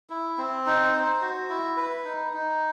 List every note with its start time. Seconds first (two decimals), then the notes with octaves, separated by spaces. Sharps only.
0.10 E4
0.38 C4
0.66 D#4
0.93 C5
1.21 F#4
1.49 E4
1.77 B4
2.04 D#4
2.33 D#4